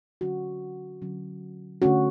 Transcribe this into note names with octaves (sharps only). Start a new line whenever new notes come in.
D3 F#3 C#4 F#4
D3 F#3 C#4
D3 A3 C#4 F#4